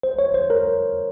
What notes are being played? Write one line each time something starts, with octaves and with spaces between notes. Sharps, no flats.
C5
C#5
C5
A#4